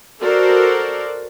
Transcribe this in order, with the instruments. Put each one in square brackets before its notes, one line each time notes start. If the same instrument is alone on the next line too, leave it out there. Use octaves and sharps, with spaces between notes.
[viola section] F#4 A4 A#4 C5 D5